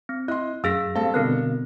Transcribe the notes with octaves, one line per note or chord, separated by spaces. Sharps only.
C4
E4 D#5 C6 F#6
F#2 G#4 F5 E6 A#6 B6
G2 C4 A4 F5 A5
B2 D3 B3 C4 A#4 F#6